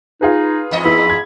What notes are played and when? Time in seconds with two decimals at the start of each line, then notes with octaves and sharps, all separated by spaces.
0.21 D#4 F4 G#4 B4
0.71 E2 G#2 D#5
0.84 B3 E4 B5
1.10 G#6